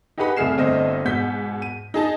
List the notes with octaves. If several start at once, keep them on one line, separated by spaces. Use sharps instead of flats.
D#4 G4 G#4 B4 F#5 B5
C2 A3 G#4 F6 C7 E7
G1 A3 C4 D#5
G#2 B2 F#5 G6 B6
D#7
D#4 G#4 A5